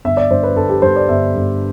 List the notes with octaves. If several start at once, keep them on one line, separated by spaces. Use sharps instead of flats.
G1 E5
D5
G2 C5
B4
G1 A4
G4
G2 C5
D5
G1 E5
G2